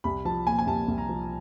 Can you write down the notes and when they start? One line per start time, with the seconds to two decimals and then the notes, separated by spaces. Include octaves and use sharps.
0.04 C2 B5
0.25 F3 A5
0.46 A#2 G#5
0.59 G#5
0.67 C2 A5
0.88 C2
0.98 A#5
1.09 F3